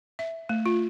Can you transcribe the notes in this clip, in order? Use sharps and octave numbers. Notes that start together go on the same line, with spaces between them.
E5
A3
F4